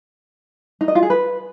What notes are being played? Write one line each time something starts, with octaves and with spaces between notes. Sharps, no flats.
D#4
D#5
F4
G#4
B4